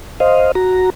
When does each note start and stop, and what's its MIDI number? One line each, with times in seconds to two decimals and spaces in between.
0.20 0.52 72
0.20 0.52 75
0.20 0.52 77
0.55 0.90 66
0.55 0.90 82